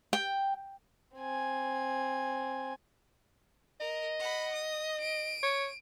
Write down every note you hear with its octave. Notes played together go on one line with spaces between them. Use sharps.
G5
C4 G#5
A#4 D#5
F#5 B5
D#6
D7 D#7
C#5